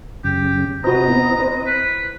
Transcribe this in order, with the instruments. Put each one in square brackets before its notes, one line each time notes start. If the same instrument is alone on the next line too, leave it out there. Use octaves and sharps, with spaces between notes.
[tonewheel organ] F#2 C#3 [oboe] G4
[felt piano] C3 F#4 [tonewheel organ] C4 B4 D#5 [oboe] A#5
[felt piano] B3 E4
E4 C5
[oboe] B4